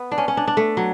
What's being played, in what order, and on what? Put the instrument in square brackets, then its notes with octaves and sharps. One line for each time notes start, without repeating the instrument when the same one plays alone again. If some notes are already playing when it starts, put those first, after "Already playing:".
Already playing: [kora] B3
D4
C#4
C#4
D4
D4
A3
F#3